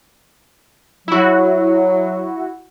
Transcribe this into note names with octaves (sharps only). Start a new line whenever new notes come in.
F#3 E4 F#4